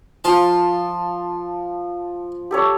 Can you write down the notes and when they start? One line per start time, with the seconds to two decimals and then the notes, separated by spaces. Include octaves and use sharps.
0.24 F3 F4 A5
2.51 G4 A4 C#5